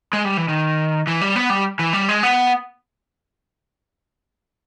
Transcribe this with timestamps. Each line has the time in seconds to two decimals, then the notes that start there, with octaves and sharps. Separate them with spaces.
0.13 G#3
0.25 G3
0.37 E3
0.48 D#3
1.07 E3
1.21 G3
1.36 B3
1.50 G3
1.79 E3
1.93 G3
2.09 G#3
2.23 B3